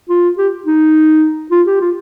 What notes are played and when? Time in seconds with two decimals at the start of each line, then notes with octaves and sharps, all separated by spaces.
0.09 F4
0.38 G4
0.66 D#4
1.52 F4
1.67 G4
1.81 F4